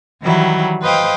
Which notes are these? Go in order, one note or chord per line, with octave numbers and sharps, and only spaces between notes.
D#3 E3 F#3 G3 E4
B4 C5 D#5 F5 G5